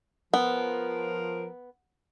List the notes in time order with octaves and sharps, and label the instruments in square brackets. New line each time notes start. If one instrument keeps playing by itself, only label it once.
[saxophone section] F3 A#4 [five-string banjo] B3